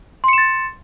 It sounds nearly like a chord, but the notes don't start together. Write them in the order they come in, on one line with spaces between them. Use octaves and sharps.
C6 C#7 E7 A6